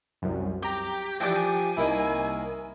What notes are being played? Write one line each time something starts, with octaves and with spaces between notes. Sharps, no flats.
C2 F#2
G4 G5 A#5
E3 F3 D4 G4 G5 D6
G#5
C2 D#3 A#3 E4